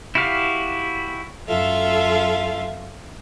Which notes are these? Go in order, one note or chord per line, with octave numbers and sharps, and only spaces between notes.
E4 F#4 G4 F5
F#2 F4 A4 E5 F5